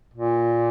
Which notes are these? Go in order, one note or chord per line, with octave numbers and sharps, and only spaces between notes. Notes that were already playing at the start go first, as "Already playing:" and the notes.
A#2